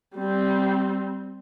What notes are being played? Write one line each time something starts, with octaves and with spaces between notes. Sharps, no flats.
G3 C4